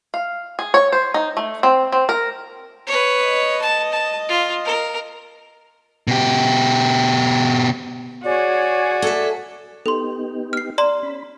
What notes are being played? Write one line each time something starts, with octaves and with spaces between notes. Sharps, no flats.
F5
G#4
C#5
C5
D#4
A3
C4
C4
A#4
B4 C#5
D#5
A5
A5
F4
A#4
B2 G4
F#4 G#4 C#5 D5
A4 E5
B3 D#4 G4 A4 C6
F6 C7
D5 A#5 C6
C#4 B5